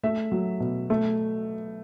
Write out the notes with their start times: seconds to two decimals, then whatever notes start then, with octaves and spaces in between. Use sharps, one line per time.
0.03 A3 E5
0.32 F#3
0.60 B2
0.90 A3